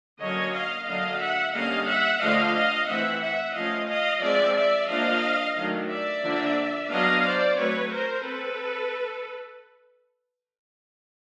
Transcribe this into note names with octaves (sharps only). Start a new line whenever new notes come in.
D3 F#3 A#3 C#4 C#5 D#5
D#5 F5
D3 F#3 A#3 D4 D#5 F5
E5 F#5
D3 G3 A#3 C#4 D#5 F5
E5 F#5
D3 F3 A3 D4 D#5 F5
D#5 F5
E3 A3 C4 E5 F#5
E5 F#5
F3 A3 C#4 D#5 F5
D#5 F5
F3 G#3 C4 D5 E5
D5 E5
F3 A#3 D4 D#5 F5
D#3 F#3 A3 D4
D5 E5
D3 F3 A#3 D4
F#3 B3 D4 D#5 F5
C5 D5
F#3 A3 C4 B4 C#5
A#4 C5
C4 A4 B4